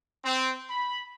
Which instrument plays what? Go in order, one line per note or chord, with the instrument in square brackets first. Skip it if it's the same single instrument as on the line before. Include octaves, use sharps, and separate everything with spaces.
[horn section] C4
B5